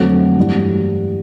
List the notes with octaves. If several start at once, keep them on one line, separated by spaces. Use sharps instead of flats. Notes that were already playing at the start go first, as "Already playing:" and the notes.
Already playing: F2 D3 F#3 A3 C4
G2 E3 G3